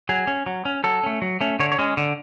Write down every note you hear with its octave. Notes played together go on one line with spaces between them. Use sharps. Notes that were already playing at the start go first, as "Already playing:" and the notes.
F#3 G#4
C#4
F#3
C#4
F#3 A4
A3 C#4
F#3
A3 C#4
D3 C#5
C#5
G#3 C#4
D3